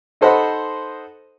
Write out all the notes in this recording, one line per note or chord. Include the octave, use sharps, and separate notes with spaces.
D#4 A4 C5 D#5 F#5 B5